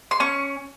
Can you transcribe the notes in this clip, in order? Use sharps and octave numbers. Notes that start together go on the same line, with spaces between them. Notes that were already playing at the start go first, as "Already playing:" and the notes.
C6
C#4 C#6